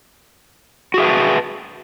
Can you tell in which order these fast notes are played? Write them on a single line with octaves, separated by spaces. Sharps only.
F#4 G#4 E5 B4 A5